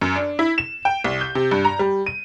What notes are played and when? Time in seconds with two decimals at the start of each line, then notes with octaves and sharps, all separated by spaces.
0.01 F#2
0.16 D4
0.39 E4
0.58 E7
0.85 G5
1.04 C2
1.21 G6
1.35 C3
1.51 G2
1.65 A#5
1.79 G3
2.06 D#7